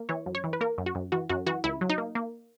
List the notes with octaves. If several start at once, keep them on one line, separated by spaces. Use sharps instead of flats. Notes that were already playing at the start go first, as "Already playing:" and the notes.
Already playing: A#3
E3 C#5
F#2
C#5
E3
B4
A#3 A#4
F#2
F#4
F#2
E3 F#4
F#2 F#4
E3 F#4
C#2 E4
F#3
D#4
A#3
A#3